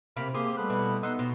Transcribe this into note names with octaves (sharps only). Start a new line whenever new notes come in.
C3 A#3 B5 F6
A#3 C4 G4 G#4 C6
G3 A3 B3 F#6
B2 E3
B3 D#4 F#5 C6 E6
B2 C6